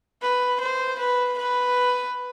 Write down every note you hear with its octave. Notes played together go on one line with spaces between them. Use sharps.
B4
C5
B4
B4